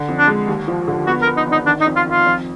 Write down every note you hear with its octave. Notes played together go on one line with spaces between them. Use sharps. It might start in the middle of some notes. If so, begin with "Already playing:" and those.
Already playing: D3
F2
D4
G#3
D#2
F3
D3
B3 F#4
A#4
B3
D#4
G#1 D#4
D#3 D4
D#4
F2
F4
D#3
F4
F2